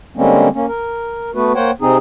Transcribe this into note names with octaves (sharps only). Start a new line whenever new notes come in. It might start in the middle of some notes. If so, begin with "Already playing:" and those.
D3 G3 G#3 A#3 C4 C#4
A#3 C#4
A#4
A3 B3 F#4 B4
A#3 C5 C#5 F#5 G5
C3 C4 D#4 G#4